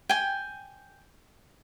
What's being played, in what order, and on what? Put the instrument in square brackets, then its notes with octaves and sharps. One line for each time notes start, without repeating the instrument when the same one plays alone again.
[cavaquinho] G5 G#5